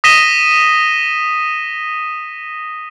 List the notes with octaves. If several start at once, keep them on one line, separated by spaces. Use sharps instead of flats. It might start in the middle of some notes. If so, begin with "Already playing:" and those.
D#6 A#6 B6 D#7 E7 G7